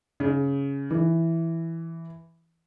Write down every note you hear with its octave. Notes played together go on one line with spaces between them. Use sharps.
C#3
E3